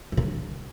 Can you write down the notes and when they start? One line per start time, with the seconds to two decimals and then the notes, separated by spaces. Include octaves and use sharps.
0.12 F#2
0.17 C3
0.23 D3